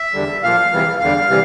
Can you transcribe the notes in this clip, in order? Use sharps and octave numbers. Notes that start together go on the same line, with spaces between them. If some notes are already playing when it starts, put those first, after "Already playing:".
Already playing: E5
E2 D3 G3
A#2 F3 F5
E2 C3 E3 G3
E2 D3 G3 F5
C3 E3 G3